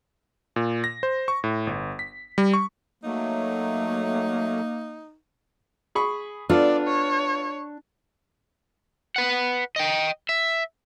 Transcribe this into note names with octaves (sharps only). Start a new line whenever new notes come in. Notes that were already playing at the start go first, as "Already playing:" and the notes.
A#2
A#6
C5
C#6
A2
G1
B6
G3
C#6
F#3 A3 A#3 D#4
G#4 B5 C#6
B3 D4 F4 A4 D5
C#5
B4 F#5
D#5 G5
E5